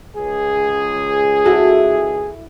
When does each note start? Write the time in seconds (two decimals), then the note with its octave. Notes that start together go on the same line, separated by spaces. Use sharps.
0.17 C#2 G#4
1.45 E4 F#4 A4